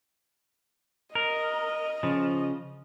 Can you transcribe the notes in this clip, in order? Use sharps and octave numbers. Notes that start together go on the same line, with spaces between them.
A#4 D#5
C#3 F3